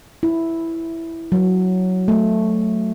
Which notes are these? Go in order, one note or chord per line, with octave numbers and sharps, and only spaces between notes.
E4
F#3
A3